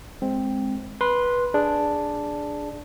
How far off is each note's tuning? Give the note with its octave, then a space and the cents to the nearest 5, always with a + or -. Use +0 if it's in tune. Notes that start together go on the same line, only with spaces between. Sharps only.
G#3 +0 C4 +0
B4 -15 C6 +0
D4 +0 G#4 +0